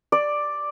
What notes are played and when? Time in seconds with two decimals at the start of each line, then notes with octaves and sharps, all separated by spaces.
0.12 D5